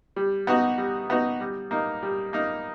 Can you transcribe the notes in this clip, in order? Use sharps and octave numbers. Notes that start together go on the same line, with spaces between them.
G3
B3 D#4 F#4
G3
B3 D#4 F#4
G3
A#3 D#4
G3
A#3 D#4